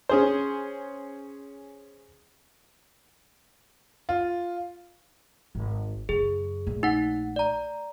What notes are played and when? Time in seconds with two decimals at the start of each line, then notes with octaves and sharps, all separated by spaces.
0.09 C#4 G#4 C5
4.09 F4
5.55 G#1
6.09 F#2 C#3 G#4
6.67 A#1 A3
6.83 D#4 F#5
7.36 D5 A#5